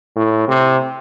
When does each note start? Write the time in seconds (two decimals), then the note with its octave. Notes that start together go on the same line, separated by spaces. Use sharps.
0.16 A2
0.48 C3